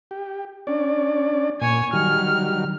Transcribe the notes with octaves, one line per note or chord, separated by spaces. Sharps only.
G4
C#4 D4 D5
A#2 C#5 G#5
D#3 F#3 G3 F6